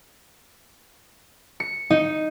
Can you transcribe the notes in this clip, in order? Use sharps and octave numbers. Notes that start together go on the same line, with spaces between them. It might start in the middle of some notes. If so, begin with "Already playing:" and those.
C#7
D#4